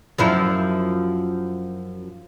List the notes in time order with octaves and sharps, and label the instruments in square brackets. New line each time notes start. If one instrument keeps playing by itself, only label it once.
[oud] F#2 F3 E4